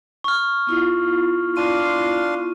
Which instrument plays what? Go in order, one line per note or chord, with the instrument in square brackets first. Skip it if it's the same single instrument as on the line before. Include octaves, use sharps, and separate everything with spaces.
[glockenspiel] C#6 F6
[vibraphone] B3 E4 F4
[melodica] D4 F5 C6 [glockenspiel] D#7